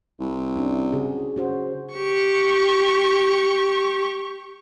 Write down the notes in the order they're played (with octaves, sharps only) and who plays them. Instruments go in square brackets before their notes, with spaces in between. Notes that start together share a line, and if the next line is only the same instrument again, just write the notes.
[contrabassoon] C2
[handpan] C#4 D4 E4
C#3 F#4 G#4
C#4 F#4 C5
[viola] G4 C#6